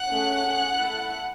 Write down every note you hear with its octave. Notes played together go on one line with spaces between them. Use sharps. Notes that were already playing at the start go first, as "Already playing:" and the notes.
Already playing: F#5 F#6
A3 C#4 G#4
C#4 G#4
A3 E4 A4